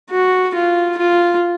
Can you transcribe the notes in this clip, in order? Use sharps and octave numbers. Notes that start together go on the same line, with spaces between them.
F#4
F4
F4